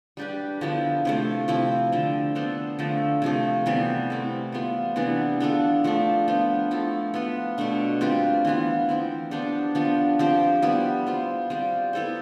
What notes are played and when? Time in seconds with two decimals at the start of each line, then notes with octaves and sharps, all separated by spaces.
0.17 G3 D4 G4 B4
0.61 D3 F3 B3 E4
1.05 C3 F3 A3
1.48 C3 F3 C4 E4
1.92 D3 F3 C4
2.35 B3 D4 A4 C5
2.79 D3 F3 A3
3.22 C3 F3 A3
3.66 C3 E3 G3 B3
4.10 A3 C4 E4
4.52 G3 B3 F4 C5
4.96 C3 E3 B3 D4
5.40 B3 D4 F4 A4
5.84 F3 A3 D4
6.28 B3 F4 C5
6.71 F3 A3 E4 A4
7.14 B3 F4 B4
7.58 B2 A3 D4
8.01 G3 C4 F4 B4
8.45 E3 B3 F4
8.89 F3 C4 E4
9.31 B3 D4 G4 C5
9.75 F3 B3 D4
10.19 F3 C4 G4 C5
10.62 G3 B3 E4
11.06 B3 F4 C5
11.50 G3 C4 F4 C5
11.93 B3 E4 A4 C5